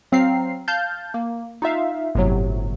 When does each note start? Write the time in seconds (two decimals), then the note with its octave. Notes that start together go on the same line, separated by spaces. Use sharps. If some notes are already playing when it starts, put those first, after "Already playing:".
0.12 F#3 C4 F5 A#5 F6 C7
0.68 F5 A5 F6 G6 A6
1.14 A#3
1.62 D#4 F4 E5 F5
2.15 G1 A2 C3 F#3